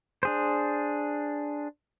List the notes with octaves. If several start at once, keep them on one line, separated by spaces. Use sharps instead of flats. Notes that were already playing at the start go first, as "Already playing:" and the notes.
D4 G#4 C5